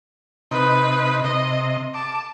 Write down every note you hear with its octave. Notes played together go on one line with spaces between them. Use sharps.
C3 D#4 B4
C3 D#5
A5 D6